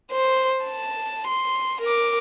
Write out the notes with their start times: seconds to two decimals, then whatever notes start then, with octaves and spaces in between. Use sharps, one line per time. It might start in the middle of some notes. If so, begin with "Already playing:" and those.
0.12 C5
0.65 A5
1.27 C6
1.81 A#4 D6